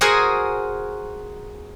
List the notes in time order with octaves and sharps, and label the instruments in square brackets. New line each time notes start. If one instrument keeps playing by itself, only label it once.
[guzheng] F#4 G#4 A#4 C5 F#5 G#5